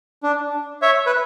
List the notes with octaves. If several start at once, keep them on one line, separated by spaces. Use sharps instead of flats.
D4
C#5 E5
B4